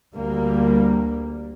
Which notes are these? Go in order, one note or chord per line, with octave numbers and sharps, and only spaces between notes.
D2 D3 G3 A#3